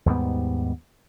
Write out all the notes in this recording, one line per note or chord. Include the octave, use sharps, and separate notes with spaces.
D#2 G#2 G3 B3